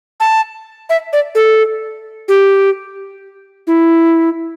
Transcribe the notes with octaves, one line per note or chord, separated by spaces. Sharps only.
A5
E5
D5
A4
G4
E4